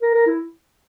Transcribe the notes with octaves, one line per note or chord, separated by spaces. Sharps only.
A#4
A#4
E4